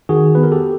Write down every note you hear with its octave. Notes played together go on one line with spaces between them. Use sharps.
D#3 F#4 G#4
B3 B4
A#4
G4 A4